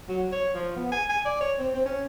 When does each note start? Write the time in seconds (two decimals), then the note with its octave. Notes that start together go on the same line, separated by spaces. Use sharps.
0.09 F#3
0.32 C#5
0.54 F3
0.76 B3
0.92 G#5
1.09 G#5
1.25 D5
1.40 C#5
1.59 C4
1.74 C4
1.85 C#4